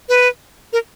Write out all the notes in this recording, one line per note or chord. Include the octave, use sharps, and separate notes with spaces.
B4
A#4